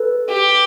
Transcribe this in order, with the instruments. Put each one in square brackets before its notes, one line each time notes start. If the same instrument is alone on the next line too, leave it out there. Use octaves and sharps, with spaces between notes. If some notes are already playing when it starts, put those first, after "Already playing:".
Already playing: [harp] A4 B4
[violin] G4